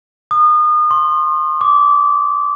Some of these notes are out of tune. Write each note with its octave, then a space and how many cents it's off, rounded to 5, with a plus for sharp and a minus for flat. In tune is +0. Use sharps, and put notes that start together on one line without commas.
D#6 -35
C6 +30
D6 -25